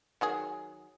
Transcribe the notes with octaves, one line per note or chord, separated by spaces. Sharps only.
D#3 F#3 G#4